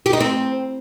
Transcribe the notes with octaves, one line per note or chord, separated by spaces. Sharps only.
G4
D#4
C4